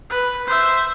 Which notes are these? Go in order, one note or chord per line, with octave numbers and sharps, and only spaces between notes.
B4
C5 E5